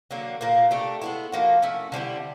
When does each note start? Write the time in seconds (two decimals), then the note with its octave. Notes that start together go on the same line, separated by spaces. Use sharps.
0.11 D3 F#3 A#3
0.41 A#2 F3 A#3
0.71 A3 D4 G4
1.01 G#3 B3 E4
1.32 F3 A#3 D#4 F#4
1.62 A3 C#4 E4
1.92 D3 G3 C4 E4